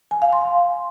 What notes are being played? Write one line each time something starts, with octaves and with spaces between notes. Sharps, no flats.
G#5
F5
C6